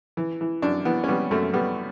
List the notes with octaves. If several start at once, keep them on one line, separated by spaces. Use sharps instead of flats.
E3
E3
F#2 D4
E3 B3
C#4
G3 B3
F#2 A3
G3 B3